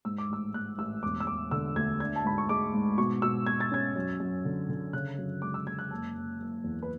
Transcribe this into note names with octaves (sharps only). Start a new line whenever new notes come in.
G#2 E6
D6
A1 E6
G#2 F#6
A1 E6
E1 D6
E6
E1 D6
D3 E6
D2 G#6
D4 G#6
A5
G#2 B5
C#6
G#3 D6
G#2
B2 C#6
B2 E6
B2 G#6
A6
C#4 G#6
F#2
F#2
D3
D3
C#3 F#6
F#2
G#3 D6
E6
G#3 G#6
F#6
F#1 A5
F#1
F#1
E2
B4